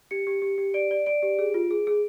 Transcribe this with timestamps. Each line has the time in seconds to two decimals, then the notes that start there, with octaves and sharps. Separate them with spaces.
0.11 G4 C#7
0.27 G4
0.42 G4
0.58 G4
0.74 D5 D7
0.91 D5
1.06 D5 D7
1.23 G4
1.39 G#4
1.54 F4
1.71 G#4
1.87 G#4